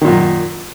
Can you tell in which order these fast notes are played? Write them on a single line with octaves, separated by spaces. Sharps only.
D#3 A#2 F#2